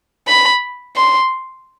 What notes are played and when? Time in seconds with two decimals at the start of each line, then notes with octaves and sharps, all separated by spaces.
0.28 B5
0.96 C6